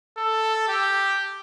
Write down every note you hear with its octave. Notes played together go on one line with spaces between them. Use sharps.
A4
G4